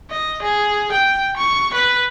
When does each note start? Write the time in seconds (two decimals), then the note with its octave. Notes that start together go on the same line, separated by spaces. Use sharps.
0.10 D#5
0.42 G#4
0.92 G5
1.37 C#6
1.74 B4